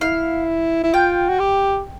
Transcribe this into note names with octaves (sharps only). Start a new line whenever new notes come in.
E4 F5
E4
F4 G5
F#4
G4